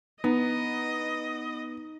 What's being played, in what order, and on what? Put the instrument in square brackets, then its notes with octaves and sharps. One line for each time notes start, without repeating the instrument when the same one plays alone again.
[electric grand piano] B3 [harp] D#4 [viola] D#5